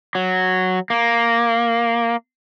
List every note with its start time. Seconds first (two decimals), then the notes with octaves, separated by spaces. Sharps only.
0.15 F#3
0.90 A#3